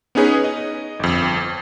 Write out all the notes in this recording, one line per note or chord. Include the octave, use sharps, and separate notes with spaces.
B3 C#4 D#4 G#4 B4 C#5
D#5
G1 F2